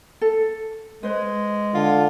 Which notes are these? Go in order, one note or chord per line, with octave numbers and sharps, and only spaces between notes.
A4
G#3 B4 C5
D3 F4